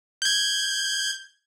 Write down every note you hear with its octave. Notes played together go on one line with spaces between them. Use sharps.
G6 G#6